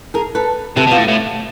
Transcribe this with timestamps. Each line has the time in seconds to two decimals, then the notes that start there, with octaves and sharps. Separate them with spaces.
0.14 G#4 A#4
0.35 A4 B4
0.77 C3 A4 B4
0.87 B2 F4 G4
0.98 A2
1.08 A2